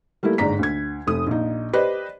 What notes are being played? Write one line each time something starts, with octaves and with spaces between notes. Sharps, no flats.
G3 A3 A#3 E4
G1 G#2 D5 A#5 B6
D2 G#6
F1 A3 D#6
A#1 D#4
G4 B4 C5 D5 D#5